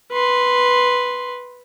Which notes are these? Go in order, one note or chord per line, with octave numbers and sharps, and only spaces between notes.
B4 C6